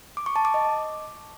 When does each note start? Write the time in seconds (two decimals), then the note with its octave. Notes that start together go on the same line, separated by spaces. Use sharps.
0.17 D6
0.26 C#6
0.36 A5
0.45 D6
0.54 D#5